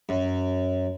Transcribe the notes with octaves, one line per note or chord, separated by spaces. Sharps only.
F#2